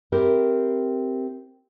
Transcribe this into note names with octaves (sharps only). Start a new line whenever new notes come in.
C4 E4 G4 A#4